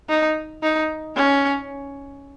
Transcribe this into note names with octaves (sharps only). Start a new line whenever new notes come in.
D#4
D#4
C#4